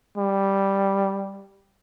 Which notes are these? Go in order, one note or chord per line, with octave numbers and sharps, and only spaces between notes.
G3